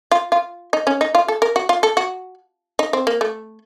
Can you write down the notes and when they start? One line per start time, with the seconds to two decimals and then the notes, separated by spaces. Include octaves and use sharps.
0.11 F4
0.32 F4
0.73 D#4
0.87 C#4
1.01 D#4
1.15 F4
1.28 A4
1.42 A#4
1.56 F#4
1.69 F4
1.83 A4
1.97 F#4
2.79 D#4
2.93 C4
3.07 A#3
3.21 A3